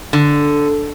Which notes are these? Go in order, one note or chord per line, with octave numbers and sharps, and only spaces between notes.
D3